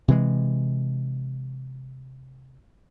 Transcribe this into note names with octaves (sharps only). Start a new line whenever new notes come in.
C3 E3 G#3